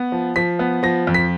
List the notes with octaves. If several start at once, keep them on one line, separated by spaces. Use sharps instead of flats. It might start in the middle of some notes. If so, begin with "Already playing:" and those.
Already playing: B3
F3
F3 B6
B3
F3 A#6
F2
B6